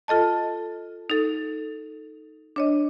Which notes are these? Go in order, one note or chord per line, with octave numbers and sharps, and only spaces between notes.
F4 A4 D#5 A5
D#4 A4
D4 C#5 D#5